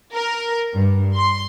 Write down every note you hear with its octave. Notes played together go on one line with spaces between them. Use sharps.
A#4
G2
C6